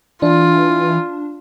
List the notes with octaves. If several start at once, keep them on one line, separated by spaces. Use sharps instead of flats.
E3 D4 F4